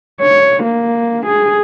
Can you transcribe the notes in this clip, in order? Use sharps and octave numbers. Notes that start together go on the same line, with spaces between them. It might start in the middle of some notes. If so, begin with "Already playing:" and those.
C#5
A#3
G#4